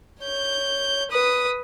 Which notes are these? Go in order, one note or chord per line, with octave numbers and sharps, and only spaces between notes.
C#5 G6
B4 D#6